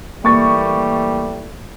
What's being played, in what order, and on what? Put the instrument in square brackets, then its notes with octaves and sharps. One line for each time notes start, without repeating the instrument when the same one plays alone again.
[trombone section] E3 G3 A3 [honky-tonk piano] A#3 C#6 A6